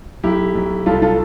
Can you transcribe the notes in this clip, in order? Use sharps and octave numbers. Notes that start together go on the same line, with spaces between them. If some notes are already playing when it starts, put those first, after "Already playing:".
B1 E4 G4
B1
C2 F4 A4
F4 A4